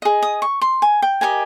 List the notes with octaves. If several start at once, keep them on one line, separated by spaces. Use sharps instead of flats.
G#4 D#5
D#6
C#6
C6
G#5
G5
G4 A#4 D#5 G#5